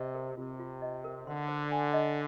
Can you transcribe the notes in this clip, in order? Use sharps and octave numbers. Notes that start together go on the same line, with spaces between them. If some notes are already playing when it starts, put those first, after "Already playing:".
Already playing: C3 D#5
A#4
C3 F4
F4
D#5
A#4
D3 C6
C5
G#5
D#5